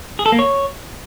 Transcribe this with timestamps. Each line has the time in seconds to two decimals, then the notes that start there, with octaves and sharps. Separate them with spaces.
0.19 G#4
0.26 A4
0.32 A#3
0.39 C#5